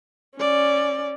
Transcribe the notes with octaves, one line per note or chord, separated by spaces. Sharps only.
C#4 D5